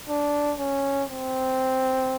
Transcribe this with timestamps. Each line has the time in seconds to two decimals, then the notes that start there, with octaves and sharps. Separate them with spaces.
0.09 D4
0.59 C#4
1.09 C4